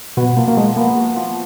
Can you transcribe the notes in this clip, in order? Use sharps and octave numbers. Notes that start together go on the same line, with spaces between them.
B2 B3 F#4
F3 A#3
A#3
F3 G#3
A#3 B3
F#4
F3